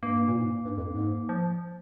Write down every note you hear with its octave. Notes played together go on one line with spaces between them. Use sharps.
G2 A#3
G2
A#2
G#2
G2
F2
G#2
F3